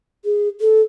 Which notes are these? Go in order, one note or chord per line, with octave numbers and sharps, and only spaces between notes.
G#4
A4